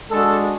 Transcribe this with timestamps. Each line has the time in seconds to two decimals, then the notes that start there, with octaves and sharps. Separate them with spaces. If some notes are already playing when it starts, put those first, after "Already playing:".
0.11 G#3 D4 F#4 A4